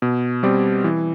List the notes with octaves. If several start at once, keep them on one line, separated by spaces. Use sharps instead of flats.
B2
G3 C4 G4 D5
E3